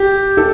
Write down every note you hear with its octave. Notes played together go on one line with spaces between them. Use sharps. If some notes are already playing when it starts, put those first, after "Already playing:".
Already playing: G4
A4